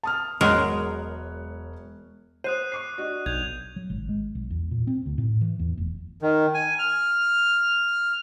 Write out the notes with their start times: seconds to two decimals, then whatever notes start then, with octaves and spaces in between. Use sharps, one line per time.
0.03 A5 D#6 F6
0.41 E1 F#3 G#3 A#4 C#5 F#6
2.44 C5 D#6 F#6 D#7
2.72 C#6 D6 C7
2.98 D4 F#4 D#5
3.26 B1 G6 G#6 F7
3.76 F#3
3.90 G#1
4.09 G#3
4.35 B1
4.50 E2
4.71 A#2
4.87 C4
5.06 D2
5.18 A2
5.41 E3
5.59 E2
5.78 F1
6.22 D#3
6.54 G#5
6.79 F6